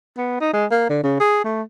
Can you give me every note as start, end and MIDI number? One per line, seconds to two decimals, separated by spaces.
0.18 0.36 59
0.41 0.49 63
0.54 0.66 56
0.71 0.87 58
0.90 0.99 50
1.03 1.17 49
1.20 1.43 68
1.44 1.62 57